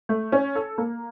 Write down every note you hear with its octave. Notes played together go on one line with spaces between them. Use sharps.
A3
C#4
A4
A#3